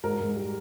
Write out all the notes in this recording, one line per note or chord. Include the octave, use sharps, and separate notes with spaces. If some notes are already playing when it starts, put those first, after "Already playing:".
G#2 A#4
G#2
G3